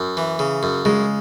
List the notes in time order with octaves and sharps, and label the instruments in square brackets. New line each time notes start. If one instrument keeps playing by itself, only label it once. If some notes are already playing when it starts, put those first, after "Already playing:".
Already playing: [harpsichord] F#2
E3
C#3
F#2
[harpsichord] C#3 [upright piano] G#3